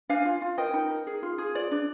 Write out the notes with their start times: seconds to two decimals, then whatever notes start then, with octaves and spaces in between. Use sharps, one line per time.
0.09 D4 F5 G#5
0.25 F4
0.42 F4
0.58 A#4 D#5 G5
0.74 D#4
0.90 A#4
1.07 G#4
1.23 F4
1.38 G#4
1.55 F4 D5
1.71 D4